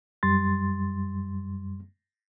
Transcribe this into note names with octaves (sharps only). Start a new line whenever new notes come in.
F#2 G3 C6 A6